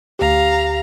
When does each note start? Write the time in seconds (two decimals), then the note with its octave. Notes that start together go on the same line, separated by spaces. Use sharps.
0.19 D2 G4 F5 A#5